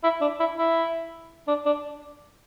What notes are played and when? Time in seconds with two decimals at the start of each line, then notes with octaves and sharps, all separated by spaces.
0.03 E4
0.21 D4
0.39 E4
0.57 E4
1.48 D4
1.66 D4